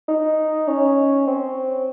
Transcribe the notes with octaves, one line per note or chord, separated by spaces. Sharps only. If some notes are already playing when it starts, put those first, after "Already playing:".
D#4
C#4
C4